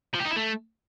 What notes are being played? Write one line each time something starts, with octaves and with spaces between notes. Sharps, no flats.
F3
G4
D#4
E4
A3